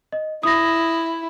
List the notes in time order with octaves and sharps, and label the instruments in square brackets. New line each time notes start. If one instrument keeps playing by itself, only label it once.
[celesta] D#5
[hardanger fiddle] E4 [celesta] D#6 A#6